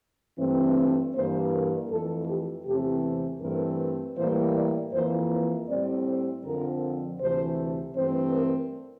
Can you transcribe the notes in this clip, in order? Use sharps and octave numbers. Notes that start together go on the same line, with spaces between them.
G2 E3 A3 C4
G2 E3 A#3 C5
A#4
F2 E3 A3 A4
G4
E2 C3 E3 A3 C4 G4
G2 E3 A3 C4 A#4
A2 E3 G3 A#3 C5
D5
F2 E3 A#3 C5
C5
A2 G3 C4 D5
C5
F2 D3 F3 C4 A#4
D2 C3 E3 A3 C5
G2 E3 A3 C4 C5
A#4